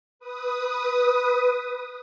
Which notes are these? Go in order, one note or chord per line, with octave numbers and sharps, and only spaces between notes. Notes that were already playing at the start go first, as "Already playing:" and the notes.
B4 D#6